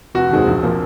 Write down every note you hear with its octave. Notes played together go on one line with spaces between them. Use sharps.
F1 F#4
D#2 D#3 G#3 C4
A#1
A#2 F3 A#3